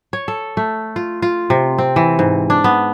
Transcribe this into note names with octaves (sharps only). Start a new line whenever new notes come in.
C#5
A4
A3
F4
F4
C3
C4
E3
G#2
D4
B3